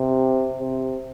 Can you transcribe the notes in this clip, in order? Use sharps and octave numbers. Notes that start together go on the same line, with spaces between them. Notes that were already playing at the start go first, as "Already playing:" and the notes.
Already playing: C3
C3